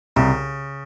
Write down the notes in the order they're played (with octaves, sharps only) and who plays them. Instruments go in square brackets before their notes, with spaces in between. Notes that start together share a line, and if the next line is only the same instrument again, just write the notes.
[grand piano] C2 [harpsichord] C#3